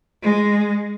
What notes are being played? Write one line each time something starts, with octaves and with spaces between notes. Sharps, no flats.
G#3